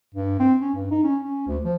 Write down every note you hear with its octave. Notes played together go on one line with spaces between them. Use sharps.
G2
C4
C#4
G2
D#4
C#4
C#4
D2
F3